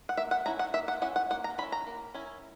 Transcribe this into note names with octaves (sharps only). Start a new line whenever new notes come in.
F#5
A#3 E5
F#5
C#4 E4 A#5
F#5
A#3 E5
F#5
C#4 E4 F#5
F#5
A#3 F#5
A#5
C#4 E4 B5
A#5
A#3
C#4 E4